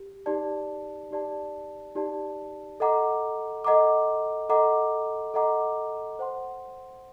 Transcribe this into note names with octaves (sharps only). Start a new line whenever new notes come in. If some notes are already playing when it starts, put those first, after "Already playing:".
Already playing: G4
D#4 G4 D5 A5
D#4 G4 D5 A5
D#4 G4 D5 A5
A4 D#5 F#5 A#5 D6
A4 D#5 F#5 A#5 D6
A4 D#5 F#5 A#5 D6
A4 D#5 F#5 A#5 D6
C5 F#5 C6